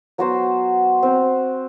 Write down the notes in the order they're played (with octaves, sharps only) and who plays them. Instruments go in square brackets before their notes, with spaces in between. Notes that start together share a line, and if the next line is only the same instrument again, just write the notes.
[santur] F#3 B3 F#4 C5
C4 F#4 C5